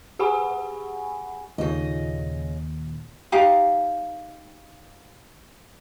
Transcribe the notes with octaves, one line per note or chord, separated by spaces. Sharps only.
G4 G#4 F#5 G#5 B5 C#6
D#2 A#2 C#3 D#5
D#4 G4 F5 A#5